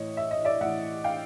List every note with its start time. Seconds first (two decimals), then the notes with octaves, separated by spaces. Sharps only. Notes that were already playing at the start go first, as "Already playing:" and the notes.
Already playing: A2 E3 C#5 D#5
0.17 E5
0.31 D#5
0.45 D5 E5
0.61 A2 E3 E5 F#5
1.04 F5 G5